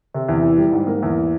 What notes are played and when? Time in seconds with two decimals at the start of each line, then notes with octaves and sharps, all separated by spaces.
0.14 C3
0.29 E2
0.43 E3
0.58 G3
0.72 G#2
0.87 A#3
1.03 E2